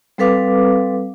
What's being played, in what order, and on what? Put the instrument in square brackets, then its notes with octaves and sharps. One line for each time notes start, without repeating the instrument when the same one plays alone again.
[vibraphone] G3 C4 A4 B4 F5 D6